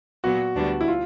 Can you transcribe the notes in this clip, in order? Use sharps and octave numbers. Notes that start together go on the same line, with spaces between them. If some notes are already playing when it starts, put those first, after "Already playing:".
A#2 F#3 B3 F#4
D2 D3 G3 B3 D4
E4
F4